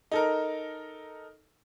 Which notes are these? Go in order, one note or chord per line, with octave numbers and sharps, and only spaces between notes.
D#4 A4 A#4